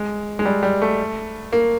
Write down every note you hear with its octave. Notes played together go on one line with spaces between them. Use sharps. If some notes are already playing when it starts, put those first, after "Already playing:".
Already playing: G#3
G#3
G3
G3
A3
A#3